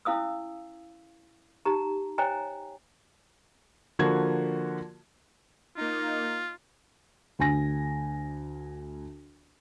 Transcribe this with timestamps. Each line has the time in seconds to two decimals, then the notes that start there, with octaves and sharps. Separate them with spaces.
0.05 C#4 E4 F5 D#6 E6
1.65 D#4 G4 A#5
2.18 C5 C#5 D#5 G5 G#5 A#5
3.99 D3 F3 A#3 F#4 G#6
5.77 A#3 D#4 F4
7.39 D2 G#5 A#6